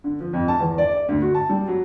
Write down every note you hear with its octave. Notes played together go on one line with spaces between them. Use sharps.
D3
F3
F2
A5
E2
D5
D5
D2
F#4
A5
G3
F#3